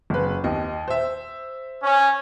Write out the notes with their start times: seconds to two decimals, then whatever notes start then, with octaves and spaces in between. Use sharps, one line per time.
0.10 F#1 B4
0.44 D#2 D#5
0.88 C5 E5
1.83 C#4